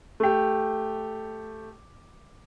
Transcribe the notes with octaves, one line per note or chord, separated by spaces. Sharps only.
A3 G4